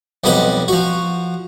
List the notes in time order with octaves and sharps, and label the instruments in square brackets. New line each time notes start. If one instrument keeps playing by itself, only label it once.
[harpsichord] B1 F2 G3 B4 D#5 F#5
F3 F#4